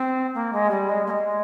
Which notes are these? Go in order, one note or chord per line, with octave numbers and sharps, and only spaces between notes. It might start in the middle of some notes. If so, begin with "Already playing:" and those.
Already playing: C4
A#3
G#3
G3
G#3
A#3
G#3